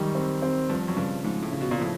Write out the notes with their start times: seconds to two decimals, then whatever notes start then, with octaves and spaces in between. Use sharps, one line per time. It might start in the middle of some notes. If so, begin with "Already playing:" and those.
Already playing: F#2 D#3 G3
0.15 C4
0.42 C4
0.70 G2 F3
0.88 F#2
0.96 G2 C#3
1.24 G#2 F3
1.42 A2
1.52 C#3
1.61 B2
1.71 A#2
1.79 A2 F3